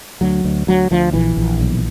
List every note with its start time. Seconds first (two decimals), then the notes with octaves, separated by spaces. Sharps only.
0.21 D2 F#3
0.44 D2
0.67 D2 F#3
0.91 D2 F3
1.13 A#1 E3
1.37 A#1
1.60 B1